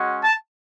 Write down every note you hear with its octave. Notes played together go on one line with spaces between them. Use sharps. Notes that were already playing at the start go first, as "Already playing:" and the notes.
Already playing: G#3 C#4 F#4
A5